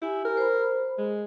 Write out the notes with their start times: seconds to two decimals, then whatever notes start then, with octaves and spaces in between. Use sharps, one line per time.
0.02 E4 G4 G#5
0.25 A#4
0.37 C5 B5
0.98 G#3